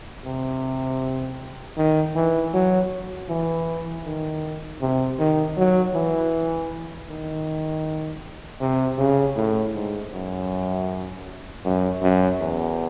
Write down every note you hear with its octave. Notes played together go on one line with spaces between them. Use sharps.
C3
D#3
E3
F#3
E3
D#3
C3
D#3
F#3
E3
D#3
C3
C#3
A2
G#2
F#2
F#2
F#2
E2